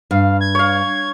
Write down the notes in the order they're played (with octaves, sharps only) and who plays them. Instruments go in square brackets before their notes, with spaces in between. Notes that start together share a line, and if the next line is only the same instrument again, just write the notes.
[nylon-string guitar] G2 [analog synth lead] F5
[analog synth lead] G#6
[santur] C#5 F5